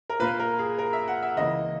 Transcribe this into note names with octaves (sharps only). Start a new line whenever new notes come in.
A#4
A#2 A#3 B4
A#4
G#4
A#4
E5
F#5
E5
C#2 C#3 E3 A#3 D#5